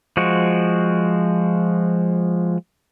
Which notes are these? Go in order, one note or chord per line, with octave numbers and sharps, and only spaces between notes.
F3 G#3 F#4